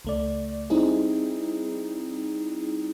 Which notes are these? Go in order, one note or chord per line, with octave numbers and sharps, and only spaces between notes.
C#2 A3 D5
G3 C4 D#4 E4 G#4